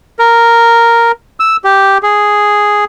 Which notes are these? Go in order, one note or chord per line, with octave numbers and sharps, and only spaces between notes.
A#4
E6
G4
G#4